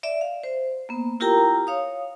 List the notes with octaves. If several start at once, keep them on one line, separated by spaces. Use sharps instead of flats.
D5 E5
F5
C5
A#3 B3
E4 F4 G4 A#4 G5 A#5
C#5 F5 D#6